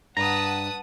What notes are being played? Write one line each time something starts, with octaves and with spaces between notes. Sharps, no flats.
G2 B4 F#5 A5 A#5 D#6